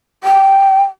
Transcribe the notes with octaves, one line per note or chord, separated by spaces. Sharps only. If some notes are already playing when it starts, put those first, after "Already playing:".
G5